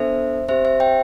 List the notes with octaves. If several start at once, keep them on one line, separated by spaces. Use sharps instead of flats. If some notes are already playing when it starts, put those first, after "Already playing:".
Already playing: B3 D4 A4 C5 E5
C4 G4 C5 E5
C5 E5
E5 G5